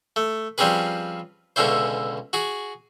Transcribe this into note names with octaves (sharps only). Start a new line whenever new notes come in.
A3
F3 G3 C4 C#4 G#4 B4
C#2 B2 D3 C#4 E4 C5
F#4 G#4